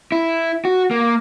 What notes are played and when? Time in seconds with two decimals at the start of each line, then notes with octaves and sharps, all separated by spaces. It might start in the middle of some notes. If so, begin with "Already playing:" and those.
0.12 E4
0.65 F#4
0.91 A#3